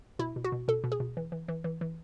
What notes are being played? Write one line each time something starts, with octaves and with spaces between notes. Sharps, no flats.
B2 E4
B2
F#4
B2
B2 A4
B2
G#4
B2
E3
E3
E3
E3
E3